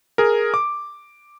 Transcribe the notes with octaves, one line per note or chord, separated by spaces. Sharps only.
G#4 A#4
D6